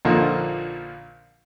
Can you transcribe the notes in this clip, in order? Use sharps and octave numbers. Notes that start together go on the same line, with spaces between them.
A#1 A#2 D3 F3 A#3 D#4